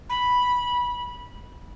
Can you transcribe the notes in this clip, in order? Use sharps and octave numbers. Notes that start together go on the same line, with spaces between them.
B5